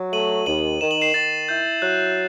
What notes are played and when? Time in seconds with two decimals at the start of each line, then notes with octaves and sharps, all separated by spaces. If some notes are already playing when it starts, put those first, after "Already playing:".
Already playing: F#3
0.13 A3 D#7 F#7
0.46 D#2 D#7 F#7
0.80 D#3 E7
0.91 F#7
1.01 C7 E7
1.14 D#3 A6
1.48 E4 G6
1.81 F#3 F#6